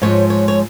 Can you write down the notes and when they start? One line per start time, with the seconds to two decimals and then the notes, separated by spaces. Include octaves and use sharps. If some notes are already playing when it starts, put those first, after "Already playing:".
0.02 G#2 F3 G#3 C#5
0.30 C#5
0.48 C#5